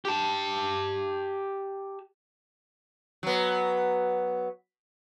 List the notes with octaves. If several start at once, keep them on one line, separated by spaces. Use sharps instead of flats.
G4 A5
F#3 B3